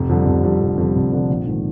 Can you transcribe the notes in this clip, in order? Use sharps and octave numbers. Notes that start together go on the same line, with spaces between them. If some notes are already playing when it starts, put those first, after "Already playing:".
Already playing: F1
F2 D3 G3
F1
F2 D3 G3
F1
F2 D3 G3
F1
F2 D3 G3
A#1
G#2 D#3